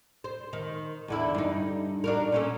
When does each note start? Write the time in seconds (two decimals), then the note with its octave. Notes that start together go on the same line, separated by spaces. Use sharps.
0.24 C5
0.53 D#3
1.08 E2 D3 E4
1.35 G2 D#4
2.04 D4 F#4 A#4
2.32 A#2 C#4 A4